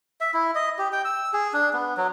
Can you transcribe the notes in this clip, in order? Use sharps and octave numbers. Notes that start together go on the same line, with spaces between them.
E5
E4
D#5
G4
G5
E6
G#4
D4
B3
F#3